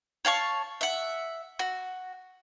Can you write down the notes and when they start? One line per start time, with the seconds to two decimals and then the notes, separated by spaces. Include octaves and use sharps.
0.25 C#5 F5 A5 C#6
0.81 E5 F#5
1.59 F#4